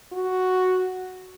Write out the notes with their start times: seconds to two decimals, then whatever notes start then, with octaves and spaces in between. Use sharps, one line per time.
0.12 F#4